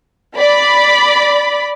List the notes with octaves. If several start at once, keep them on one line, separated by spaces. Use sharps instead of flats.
D5 B5